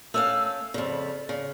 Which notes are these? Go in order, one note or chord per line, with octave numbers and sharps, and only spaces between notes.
A3 C#4 F5 E6
F2 C#3 D5
C#3